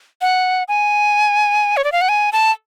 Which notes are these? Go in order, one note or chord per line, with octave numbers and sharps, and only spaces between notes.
F#5
G#5
C#5
D5
F5
F#5
G#5
A5